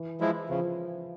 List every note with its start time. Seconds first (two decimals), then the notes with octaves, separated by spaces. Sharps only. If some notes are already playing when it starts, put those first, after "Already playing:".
Already playing: E3
0.21 F3 G#3 E4
0.50 C#3 F3